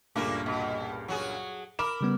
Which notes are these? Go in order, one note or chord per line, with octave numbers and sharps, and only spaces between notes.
C#2 G2 A#2 A3 A#3 D4
B2
F#3 F#4 G#4
A#4 B5 D6 E7
C#3 G3 B3